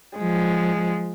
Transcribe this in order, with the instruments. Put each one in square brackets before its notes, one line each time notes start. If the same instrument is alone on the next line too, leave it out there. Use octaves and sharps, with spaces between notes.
[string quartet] F3 G#3